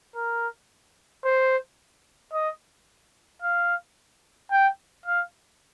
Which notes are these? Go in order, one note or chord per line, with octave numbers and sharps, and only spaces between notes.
A#4
C5
D#5
F5
G5
F5